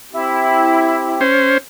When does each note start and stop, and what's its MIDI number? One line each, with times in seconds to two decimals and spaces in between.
0.13 1.21 60
0.13 1.23 64
0.13 1.21 67
1.21 1.58 61
1.21 1.58 72